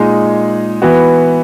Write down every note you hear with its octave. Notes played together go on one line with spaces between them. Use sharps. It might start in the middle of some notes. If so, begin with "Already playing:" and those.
Already playing: A#2 G#3 D#4 G#4
E3 B3 F#4